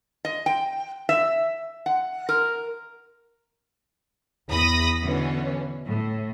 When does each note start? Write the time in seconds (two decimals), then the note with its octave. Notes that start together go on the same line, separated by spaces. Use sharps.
0.25 D#5
0.46 G5
1.09 E5
1.86 F#5
2.29 A#4
4.48 E2 B5 D#6 A#6
5.02 B2 D3 E3 C#4
5.85 A2